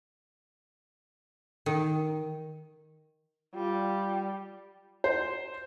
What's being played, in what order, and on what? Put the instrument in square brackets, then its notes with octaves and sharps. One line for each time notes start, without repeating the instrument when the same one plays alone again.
[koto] D#3
[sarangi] G3 [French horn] F4
[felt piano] C5